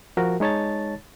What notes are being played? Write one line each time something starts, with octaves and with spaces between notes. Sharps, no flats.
F3 F#4 A#4
G#3 D#4 C#5 A5 A6